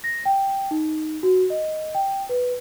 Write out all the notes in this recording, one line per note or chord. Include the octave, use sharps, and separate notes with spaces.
A#6
G5
D#4
F#4
D#5
G5
B4